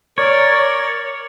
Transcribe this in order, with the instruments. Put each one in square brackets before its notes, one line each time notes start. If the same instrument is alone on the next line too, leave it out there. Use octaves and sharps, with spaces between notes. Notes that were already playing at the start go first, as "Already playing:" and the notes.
[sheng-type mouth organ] A#4 D5 [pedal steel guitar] C#5